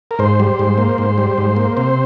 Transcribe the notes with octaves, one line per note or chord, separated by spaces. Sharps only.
A#4
G#2 C5
G3
G#2
A#3
G#2
G3
G#2
A#3
C3 C5